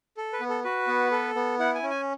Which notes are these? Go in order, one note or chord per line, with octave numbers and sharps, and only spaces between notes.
A4
B4
B3
A4
F#4 B4
B3
A4
B3
E4 F#5
G#5
C#4
G#5